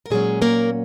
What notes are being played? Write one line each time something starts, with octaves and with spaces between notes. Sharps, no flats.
A#4
A#2 F#3 G#3 C#4 G#4
A#3 A#4